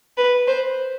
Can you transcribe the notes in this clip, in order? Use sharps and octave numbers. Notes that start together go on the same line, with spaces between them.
B4
C5